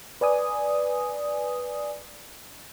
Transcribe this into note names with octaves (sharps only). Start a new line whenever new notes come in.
B4 D5 G#5 D#6